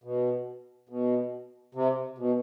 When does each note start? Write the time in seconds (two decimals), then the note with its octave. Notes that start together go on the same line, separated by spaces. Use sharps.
0.04 B2
0.89 B2
1.75 C3
2.18 B2